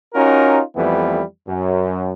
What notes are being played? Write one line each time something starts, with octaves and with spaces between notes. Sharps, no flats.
C#4 D#4 F4 F#4 A#4
F2 E3 G3 A3 B3
F#2